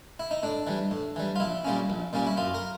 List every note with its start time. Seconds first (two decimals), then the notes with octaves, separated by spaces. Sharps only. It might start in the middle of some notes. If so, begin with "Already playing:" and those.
0.19 E4
0.31 D#4
0.43 A2 D4
0.67 E3 G3
0.91 A2
1.16 E3 G3
1.36 F4
1.40 A#1 E4
1.65 A#2 G3 A#3 C#4
1.90 A#1
2.13 A#2 G3 A#3 C#4
2.27 E4
2.37 F#2 F4
2.54 A#4